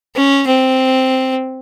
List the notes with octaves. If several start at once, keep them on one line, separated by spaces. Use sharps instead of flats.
C#4
C4